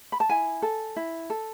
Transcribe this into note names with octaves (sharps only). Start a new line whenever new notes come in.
B5
A5
E4 G#5
A4
E4
A4